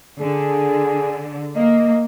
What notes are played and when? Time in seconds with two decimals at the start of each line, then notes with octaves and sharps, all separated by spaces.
0.21 D3 G#4
1.56 A#3 D#5